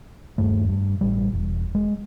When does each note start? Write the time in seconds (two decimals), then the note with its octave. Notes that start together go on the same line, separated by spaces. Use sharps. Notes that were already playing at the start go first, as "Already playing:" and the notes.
0.38 D#1 G2 A3
0.69 G2
1.01 A1 G3
1.33 E1
1.75 G#3